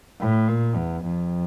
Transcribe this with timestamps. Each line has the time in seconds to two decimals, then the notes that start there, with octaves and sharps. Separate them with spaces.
0.20 A2
0.48 A#2
0.76 E2
1.05 F2